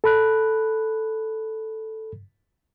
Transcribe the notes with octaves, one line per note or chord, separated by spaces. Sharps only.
A4 B5 F#6